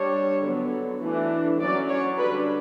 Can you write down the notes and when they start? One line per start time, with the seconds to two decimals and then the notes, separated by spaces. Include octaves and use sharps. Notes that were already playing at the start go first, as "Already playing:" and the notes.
Already playing: G3 D4 C#5
0.43 D3 F#3 B3
1.02 E3 A3 D4
1.60 F#3 C#4 D5
1.89 C#5
2.18 D3 G3 D4 B4